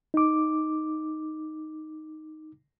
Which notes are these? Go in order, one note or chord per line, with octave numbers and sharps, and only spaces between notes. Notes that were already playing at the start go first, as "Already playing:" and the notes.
D#4 D6